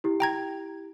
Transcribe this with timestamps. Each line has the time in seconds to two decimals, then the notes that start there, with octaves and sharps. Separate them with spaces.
0.04 E4 G4
0.20 G5 A#5 G#6